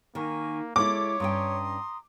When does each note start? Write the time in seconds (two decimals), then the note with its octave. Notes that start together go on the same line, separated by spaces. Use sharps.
0.15 D#3 A#3 G#5 C#6
0.76 G#3 E4 A4 C#5 D6
1.20 G2 C#4 G5 A#5 C6 D#6